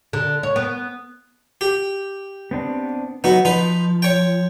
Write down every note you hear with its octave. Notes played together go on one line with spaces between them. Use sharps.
D3
C#5
B3
G4
B3 C4 D4
F#3 B3 D#4 F#4
F3 D#4 B4
C#5 G5